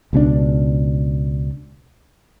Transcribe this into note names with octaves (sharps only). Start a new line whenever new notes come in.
C#2 B2 C#4 D4